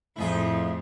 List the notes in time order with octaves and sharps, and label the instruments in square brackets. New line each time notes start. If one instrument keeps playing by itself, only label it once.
[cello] F2 A2 [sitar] E4 F4 G#4